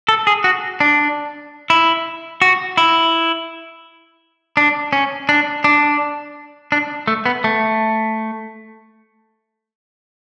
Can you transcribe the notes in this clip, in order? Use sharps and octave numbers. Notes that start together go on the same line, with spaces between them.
A4
G#4
F#4
D4
E4
F#4
E4
D4
C#4
D4
D4
D4
A3
B3
A3